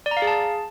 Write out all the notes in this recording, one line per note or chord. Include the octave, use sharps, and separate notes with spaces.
D5
A#5
F5
G#4
A5